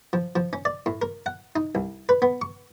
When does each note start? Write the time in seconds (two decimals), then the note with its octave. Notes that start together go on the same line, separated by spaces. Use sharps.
0.13 F3
0.36 F3
0.53 C#4
0.65 D5
0.86 A2
1.02 A#4
1.26 F#5
1.56 D#4
1.75 C2
2.09 B4
2.22 B3
2.42 C#6